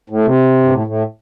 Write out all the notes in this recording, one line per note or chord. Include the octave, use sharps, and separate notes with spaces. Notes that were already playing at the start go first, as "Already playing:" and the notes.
A2
C3
G2
A2
A2